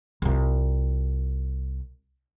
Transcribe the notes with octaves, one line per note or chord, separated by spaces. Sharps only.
C2 F4